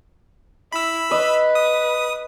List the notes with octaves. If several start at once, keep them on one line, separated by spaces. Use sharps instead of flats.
E4 B5 E6
B4 D#5
D#6